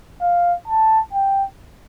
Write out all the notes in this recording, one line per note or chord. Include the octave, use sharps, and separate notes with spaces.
F5
A5
G5